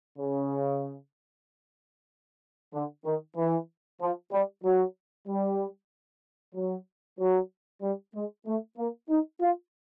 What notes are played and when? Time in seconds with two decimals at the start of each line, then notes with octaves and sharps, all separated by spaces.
0.19 C#3
2.74 D3
3.05 D#3
3.37 E3
4.01 F3
4.32 G3
4.64 F#3
5.28 G3
6.55 F#3
7.20 F#3
7.82 G3
8.15 G#3
8.47 A3
8.78 A#3
9.09 D#4
9.41 F4